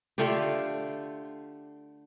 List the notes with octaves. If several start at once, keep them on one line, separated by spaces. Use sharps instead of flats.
D3 A3 F4 G4